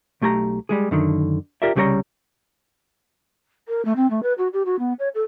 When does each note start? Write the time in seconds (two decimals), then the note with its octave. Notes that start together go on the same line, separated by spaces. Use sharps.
0.21 B1 A3 G4 G#5 A#5
0.69 G3 G#3 G#4
0.91 F#2 D3 D#3
1.62 F4 G4 A#4 D5 E5
1.76 C2 C#3 G3 G#4 C#5 A#5
3.68 A#4
3.85 A3
3.96 C4
4.10 A3
4.23 B4
4.38 F#4
4.53 G4
4.65 F#4
4.79 B3
4.99 C#5
5.14 A4